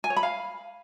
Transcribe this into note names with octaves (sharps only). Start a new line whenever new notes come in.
G#5
C#5
B5
F5